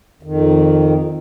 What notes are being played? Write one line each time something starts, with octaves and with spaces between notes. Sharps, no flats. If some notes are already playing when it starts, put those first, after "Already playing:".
F2 D#3